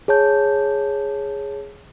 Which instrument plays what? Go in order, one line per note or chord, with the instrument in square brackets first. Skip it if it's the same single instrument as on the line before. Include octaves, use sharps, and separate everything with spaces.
[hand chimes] G#4 C#5 A5 G6